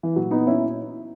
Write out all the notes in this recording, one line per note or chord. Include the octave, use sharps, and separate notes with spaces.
E3
A#2 F#3
B3 D#4
C#4 E4